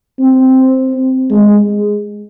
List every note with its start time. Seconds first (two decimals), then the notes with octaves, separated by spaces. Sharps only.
0.19 C4
1.31 G#3